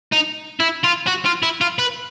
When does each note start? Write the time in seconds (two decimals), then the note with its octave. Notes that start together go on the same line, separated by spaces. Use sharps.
0.13 D#4
0.60 E4
0.84 F4
1.08 F#4
1.26 F4
1.43 E4
1.61 F4
1.79 B4